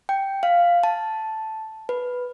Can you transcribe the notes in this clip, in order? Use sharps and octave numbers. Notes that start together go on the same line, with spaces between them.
G5
F5
A5
B4